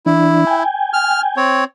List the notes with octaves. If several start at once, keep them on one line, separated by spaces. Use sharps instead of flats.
E3 D4 E4
G5 G#5
F6
C4 C#5